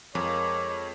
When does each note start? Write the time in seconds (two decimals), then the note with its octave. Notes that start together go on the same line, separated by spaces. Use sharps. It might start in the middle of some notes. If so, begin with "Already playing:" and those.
0.15 F2 G#3 A#3 C#5 D6